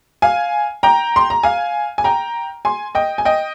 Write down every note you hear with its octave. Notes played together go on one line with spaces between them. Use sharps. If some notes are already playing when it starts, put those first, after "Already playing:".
F5 G#5
G5 A#5
C6
A#5
F5 G#5
G#5
G5 A#5
G#5 C6
D#5 G5
G#5
D#5 G5